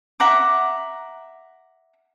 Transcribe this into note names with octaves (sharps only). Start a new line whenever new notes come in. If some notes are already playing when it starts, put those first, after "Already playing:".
E5 F#5 A#5 D6